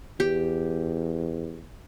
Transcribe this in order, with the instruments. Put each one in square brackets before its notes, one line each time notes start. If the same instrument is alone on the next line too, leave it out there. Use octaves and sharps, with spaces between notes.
[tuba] E2 [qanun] G4